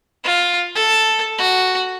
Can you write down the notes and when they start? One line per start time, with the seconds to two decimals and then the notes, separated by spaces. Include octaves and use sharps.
0.24 F4
0.76 A4
1.38 F#4